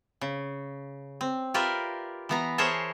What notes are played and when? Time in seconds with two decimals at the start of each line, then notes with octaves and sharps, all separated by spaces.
0.21 C#3
1.21 C4
1.54 F4 G4 A#4 B4 D5 E5
2.29 E3 B3 A#5
2.58 G#4 A#4 C5 C#5 E5 A5